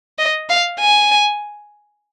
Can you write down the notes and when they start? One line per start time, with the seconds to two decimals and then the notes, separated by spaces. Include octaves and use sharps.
0.19 D#5
0.49 F5
0.80 G#5